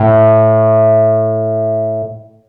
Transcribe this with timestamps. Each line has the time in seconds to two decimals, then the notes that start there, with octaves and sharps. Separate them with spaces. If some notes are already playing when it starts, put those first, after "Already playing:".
Already playing: A2